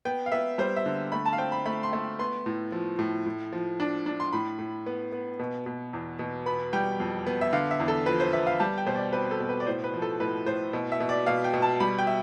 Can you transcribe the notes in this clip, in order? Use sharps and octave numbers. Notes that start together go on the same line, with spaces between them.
B3 G5
F5
B3 E5
G3 C5
E5
D3
A3 B5
A5
F5
C4 G5
B5
A3 B5
C6
A3
B3 C6
A2
F3
A2
A2
F3
D4
D4
C6
A2 B5
A2
B3
B3
B2
B2
E2
B2
B3 B5
G3 G5
F2
B3
E5
D3 F5
E5
E2
A4
F3 B4
C5
B3 E5
F5
G3 A5
G5
B2 C5
D5
C4 B4
A4
B2
B4
D5
A2 C5
B4
F3
A4
A2 B4
A2 C5
B2
E5
B2
D5
B2 F5
G5
B2
A5
G3 B5
G5
E5